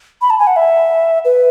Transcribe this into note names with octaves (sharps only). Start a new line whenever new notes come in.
B5
A5
G#5
F#5
E5
B4